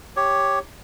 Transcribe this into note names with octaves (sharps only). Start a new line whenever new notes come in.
G4 C#5